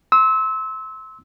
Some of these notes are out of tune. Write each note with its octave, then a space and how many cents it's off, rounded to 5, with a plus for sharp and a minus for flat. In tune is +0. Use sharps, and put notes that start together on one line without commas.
C6 +10 E6 -25